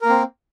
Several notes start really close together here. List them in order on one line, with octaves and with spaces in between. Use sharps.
A#4 A#3 C4